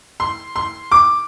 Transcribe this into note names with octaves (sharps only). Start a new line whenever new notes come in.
C6
C6
D6